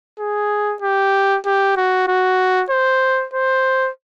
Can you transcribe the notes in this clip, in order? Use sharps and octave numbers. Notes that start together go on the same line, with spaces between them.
G#4
G4
G4
F#4
F#4
C5
C5